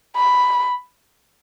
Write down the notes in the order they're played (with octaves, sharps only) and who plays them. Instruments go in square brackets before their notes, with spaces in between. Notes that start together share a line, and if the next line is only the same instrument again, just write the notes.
[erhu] B5